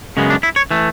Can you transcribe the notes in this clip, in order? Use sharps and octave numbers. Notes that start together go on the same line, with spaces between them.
F#2 C#3 G#3 B3
D4
E4
C#5
E3 A3